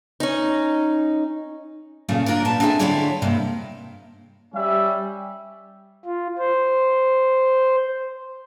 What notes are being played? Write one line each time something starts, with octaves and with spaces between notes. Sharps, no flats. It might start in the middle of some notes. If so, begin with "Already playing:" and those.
C#4 D#4
A#2 C#3 A3 F4
A#3 D4 F4 A#4
A#2 B4 A5
C4 D4 G#4 A4 E5 G#5
D3 E4 F4 B4 C#5 D5
G2 C3 A#3
G3 C#4 E5
F4
C5